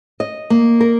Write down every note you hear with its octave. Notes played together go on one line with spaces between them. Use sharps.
D#5
A#3
A#4